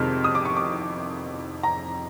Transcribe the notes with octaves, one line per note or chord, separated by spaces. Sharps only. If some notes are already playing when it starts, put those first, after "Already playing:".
Already playing: F2 C3 D#3 G#3 F6
D#6
D6
C#6
D6
A#5